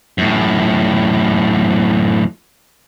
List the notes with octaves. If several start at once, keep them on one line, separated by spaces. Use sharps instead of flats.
F#2 A2